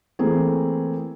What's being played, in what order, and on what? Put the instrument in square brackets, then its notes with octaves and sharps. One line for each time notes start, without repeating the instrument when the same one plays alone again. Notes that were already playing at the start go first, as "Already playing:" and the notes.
[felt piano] E3 A3 A#3 C4 G#4